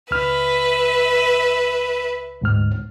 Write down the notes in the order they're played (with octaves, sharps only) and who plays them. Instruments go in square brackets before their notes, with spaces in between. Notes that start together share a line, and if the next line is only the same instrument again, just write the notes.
[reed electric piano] C#2 F6 [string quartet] B4 E5
[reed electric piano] D2 G#2 F6